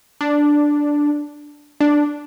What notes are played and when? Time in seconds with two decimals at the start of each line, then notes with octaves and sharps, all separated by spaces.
0.21 D4
1.80 D4